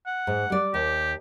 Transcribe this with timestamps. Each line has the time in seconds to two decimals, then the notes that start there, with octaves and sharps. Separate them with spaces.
0.06 F#5
0.27 G#2
0.50 G3 D5
0.74 D#2 G4